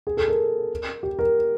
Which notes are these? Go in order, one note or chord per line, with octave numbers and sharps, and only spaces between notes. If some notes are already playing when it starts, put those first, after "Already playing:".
G#4
A4
A#4
G4
A#4